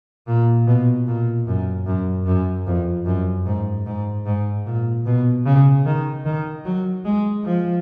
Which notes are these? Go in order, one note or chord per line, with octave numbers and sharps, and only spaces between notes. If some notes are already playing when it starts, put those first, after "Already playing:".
A#2
B2
A#2
F#2
F#2
F#2
F2
F#2
G#2
G#2
G#2
A#2
B2
C#3
D#3
D#3
F#3
G#3
F3